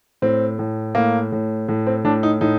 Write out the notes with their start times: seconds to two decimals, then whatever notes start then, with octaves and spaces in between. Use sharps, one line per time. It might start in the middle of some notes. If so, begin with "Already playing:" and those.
0.22 A2 C4
0.59 A2
0.95 A2 A#3
1.32 A2
1.68 A2
1.87 C4
2.04 A2 D4
2.23 D#4
2.41 A2 D#4